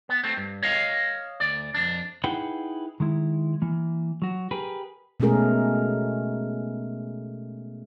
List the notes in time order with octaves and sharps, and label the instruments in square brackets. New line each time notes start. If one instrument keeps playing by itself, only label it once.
[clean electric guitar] B3
A3 C4
G2
C#5 D#5 F5
D2 D5
F2 D4
D#4 E4 G#4 B4 F#5 G5
D#3 G#3 E4
E3 A#3
F#3 F#4
G4 G#4 A#4 B4
[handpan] B2 G#3 A3 C#4 G#4 A#4